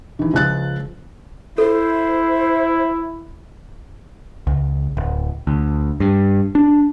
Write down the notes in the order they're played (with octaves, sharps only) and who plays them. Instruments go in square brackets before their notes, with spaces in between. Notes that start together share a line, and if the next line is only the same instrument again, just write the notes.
[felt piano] D#3 E3
C#2 F3 F#6 A6
[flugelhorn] E4 [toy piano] A4 [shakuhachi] C5
[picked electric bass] C#2
D1
D2
G2
D4